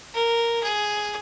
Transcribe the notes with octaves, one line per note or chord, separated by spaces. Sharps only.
A#4
G#4